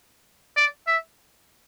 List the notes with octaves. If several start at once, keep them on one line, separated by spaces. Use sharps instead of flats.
D5
E5